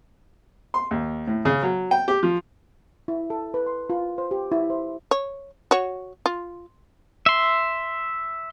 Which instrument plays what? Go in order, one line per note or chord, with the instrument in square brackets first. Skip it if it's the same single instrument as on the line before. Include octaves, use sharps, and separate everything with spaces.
[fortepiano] C6
D#2
A2
C#3
F#3
G5
G4
F3
[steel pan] E4
A4
B4
C6
F4
C5
G4
E4
C5
[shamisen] C#5
F#4 C#5
F4
[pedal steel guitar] E5 C6